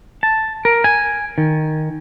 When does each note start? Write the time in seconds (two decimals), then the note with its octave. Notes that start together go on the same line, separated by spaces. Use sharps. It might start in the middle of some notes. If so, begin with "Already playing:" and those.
0.23 A5
0.65 A#4
0.84 G#5
1.38 D#3